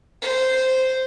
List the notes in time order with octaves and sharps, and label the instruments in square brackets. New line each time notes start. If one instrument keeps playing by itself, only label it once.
[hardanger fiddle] C5